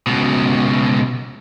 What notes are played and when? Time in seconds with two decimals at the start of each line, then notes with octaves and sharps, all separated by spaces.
0.07 C#2 B2